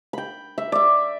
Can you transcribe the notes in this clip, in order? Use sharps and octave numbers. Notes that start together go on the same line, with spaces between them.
G5 B5
E5
D5 E5